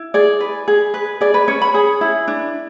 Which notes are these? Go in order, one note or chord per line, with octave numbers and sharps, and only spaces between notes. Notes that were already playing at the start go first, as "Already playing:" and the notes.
Already playing: E4
G#4 D5
B4
G#4
B4
G#4 D5
B4
C#4 C#5
B5
G#4
E4
D4